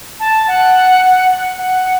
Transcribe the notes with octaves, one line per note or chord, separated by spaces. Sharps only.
A5
F#5
F#5